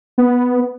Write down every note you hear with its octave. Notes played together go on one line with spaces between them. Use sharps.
B3